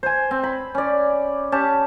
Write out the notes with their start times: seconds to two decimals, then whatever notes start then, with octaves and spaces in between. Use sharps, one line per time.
0.03 C5 G#5
0.31 C4
0.43 B5
0.75 C#4 D5
1.52 C#4 G4 A5